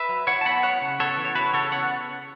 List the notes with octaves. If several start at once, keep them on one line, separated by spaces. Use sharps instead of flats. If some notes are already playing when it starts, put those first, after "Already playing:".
Already playing: B4 E5
F#3
E4 C#5 F#5
A5
B3 F#5 B5
E4 C#5 F#5
C#3
B3 A4 C#5
E3
C#5
E4 F#4 B4
C#3 A4 C#5
B3 C#5 F#5